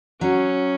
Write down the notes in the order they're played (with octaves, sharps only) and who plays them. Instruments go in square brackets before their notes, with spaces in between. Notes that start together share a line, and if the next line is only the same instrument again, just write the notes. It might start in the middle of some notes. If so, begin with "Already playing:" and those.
[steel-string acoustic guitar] F#3 [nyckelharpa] C#4